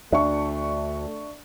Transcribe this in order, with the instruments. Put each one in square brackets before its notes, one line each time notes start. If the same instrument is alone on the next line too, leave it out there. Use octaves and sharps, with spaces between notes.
[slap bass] D2 [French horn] A3 [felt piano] D4 C#6 [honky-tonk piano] E5